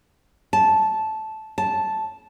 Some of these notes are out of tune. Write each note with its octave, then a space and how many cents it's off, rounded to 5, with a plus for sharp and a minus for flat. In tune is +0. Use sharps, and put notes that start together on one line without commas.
A5 -10
A5 -5